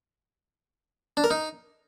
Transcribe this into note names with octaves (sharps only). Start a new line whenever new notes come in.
D4
A#4
D#4